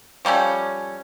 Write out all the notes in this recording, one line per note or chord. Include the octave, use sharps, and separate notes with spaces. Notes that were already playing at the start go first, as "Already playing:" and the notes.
F3 G3 A3 C#4